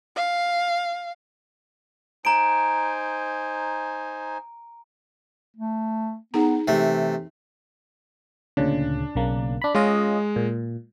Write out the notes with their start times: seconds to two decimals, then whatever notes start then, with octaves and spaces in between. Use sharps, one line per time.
0.16 F5
2.25 D#4 C5 G#5 A#5 D7
5.57 A3
6.34 B3 D#4 G#4 A#5
6.68 C3 E3 A3
8.57 D2 A#2 C#3 D4
9.15 B1 C#3 A#3
9.62 D4 B5
9.75 G#3 C#4 F4 D#5
10.36 A#2